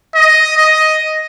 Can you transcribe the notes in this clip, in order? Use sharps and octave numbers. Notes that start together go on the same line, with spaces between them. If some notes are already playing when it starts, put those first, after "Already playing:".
D#5
D#5